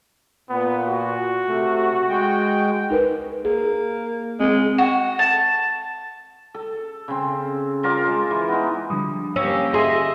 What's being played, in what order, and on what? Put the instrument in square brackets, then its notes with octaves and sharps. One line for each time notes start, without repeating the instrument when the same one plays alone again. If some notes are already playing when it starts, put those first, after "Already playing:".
[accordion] A#2 [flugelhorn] B3
[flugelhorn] F#4
[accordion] C3 A3
G#3 G5
[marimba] D#4 A#4 B4
[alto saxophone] A#3 [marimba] G#4
[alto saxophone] G#3 [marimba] C4 G#4
[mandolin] F#4
A5
[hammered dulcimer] A4
C#3 C4
F4 A#4 A5 D6
G#3
E3
B3 D#4
[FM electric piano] D3 F3 G3 [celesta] D4 B5 D#6
[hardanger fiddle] A#3 G4 [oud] C#4 [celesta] E6
[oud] G#4 [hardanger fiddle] D#5 E5 [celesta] C6 E6